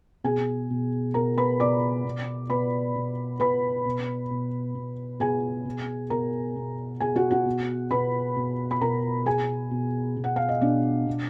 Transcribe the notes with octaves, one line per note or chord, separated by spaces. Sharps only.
B2 G#4 G#5
B2
B2 A#4 A#5
B4 B5
B2 D5 D6
B2
B2 B4 B5
B2
B2 B4 B5
B2
B2
B2
B2 G#4 G#5
B2
B2 A#4 A#5
B2
B2 G#4 G#5
F#4 F#5
F#4 F#5
B2
B2 B4 B5
B2
B5
B2 A#4 A#5
B2 G#4 G#5
B2
B2
F#5
F5
D#5
B2 D4 D5
B2